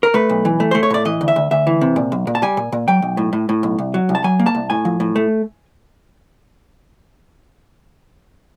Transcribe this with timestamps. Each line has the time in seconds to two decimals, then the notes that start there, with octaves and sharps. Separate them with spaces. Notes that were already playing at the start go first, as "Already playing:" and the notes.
0.03 A#4
0.14 A3 B4
0.30 B1
0.45 E3
0.60 A3
0.71 A3 C5
0.83 C#5
0.90 A2 D5
1.05 E3 D#5
1.21 D2
1.28 E5
1.36 D2
1.51 D2 E5
1.67 E3
1.81 C3
1.96 A#2
2.12 B1
2.27 A#2
2.35 A5
2.42 G3 G#5
2.57 A#2
2.72 A#2
2.88 F#3 G5
3.02 B1
3.17 A2
3.33 A2
3.49 A2
3.63 B1
3.78 C2
3.94 F#3
4.09 C2
4.15 A5
4.24 F#3 G#5
4.39 A#3
4.46 A5
4.55 C2
4.70 A2 G#5
4.85 F3
5.00 A2
5.16 A3